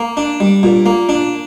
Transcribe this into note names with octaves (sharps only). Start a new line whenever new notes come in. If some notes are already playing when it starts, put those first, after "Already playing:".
Already playing: A#3
D4
G3
A#2
A#3
D4